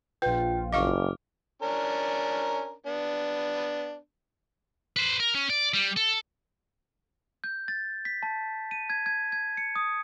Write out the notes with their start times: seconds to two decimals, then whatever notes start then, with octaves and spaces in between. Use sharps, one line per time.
0.22 A#1 F4 B4 G5
0.73 F#1 D#5 F5 C#6 D6 F6
1.62 C#4 D4 A#4
2.86 B3 D4
4.96 B4 C5
5.20 A#4
5.35 C#4
5.50 D5
5.74 G3
5.97 A4
7.44 G6
7.68 A6
8.05 B6
8.23 A5
8.71 D#7
8.90 G#6
9.06 G#6
9.32 G#6
9.57 C#7
9.76 D#6